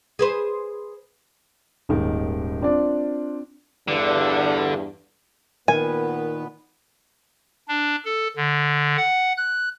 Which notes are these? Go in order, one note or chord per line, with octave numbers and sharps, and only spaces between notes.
G#4 B4 C5
D#1 D#2 G#2 D#3
C4 D4 F4 D5
E2 G2 D3
A#2 D#3 B3 B4 G#5
D4
A4
D3
F#5
F#6